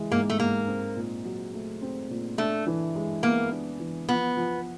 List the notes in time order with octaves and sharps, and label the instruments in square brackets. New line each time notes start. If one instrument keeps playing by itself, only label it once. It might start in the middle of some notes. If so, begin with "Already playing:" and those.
Already playing: [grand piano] E3 G#3
[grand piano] G#2 [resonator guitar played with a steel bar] A#3
[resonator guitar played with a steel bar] A3
[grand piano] G#2 [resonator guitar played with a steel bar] A#3
[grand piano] C4
A#2
F#3
A3
C4
A#2
[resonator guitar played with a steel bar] A3 [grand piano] D4
[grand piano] E3
G#3
[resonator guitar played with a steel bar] A#3 [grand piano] B3
[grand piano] D4
E3
[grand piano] F3 [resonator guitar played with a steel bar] B3
[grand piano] F3